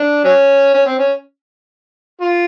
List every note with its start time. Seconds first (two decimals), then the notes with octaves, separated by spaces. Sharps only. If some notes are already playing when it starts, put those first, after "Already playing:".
Already playing: D4
0.24 F#3 C#4
0.74 C#4
0.86 C4
0.99 C#4
2.21 F4